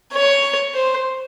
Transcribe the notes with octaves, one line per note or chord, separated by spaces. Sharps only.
C#5
C5